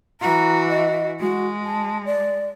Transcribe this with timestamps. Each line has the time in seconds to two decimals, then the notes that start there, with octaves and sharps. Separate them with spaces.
0.21 E3 F#4 A#5
0.69 D#5
1.20 G#3 F#4
1.64 A5
2.06 D5